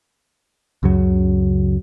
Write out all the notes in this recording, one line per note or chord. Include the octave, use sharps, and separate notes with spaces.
C#2 F#2 C#3 F#3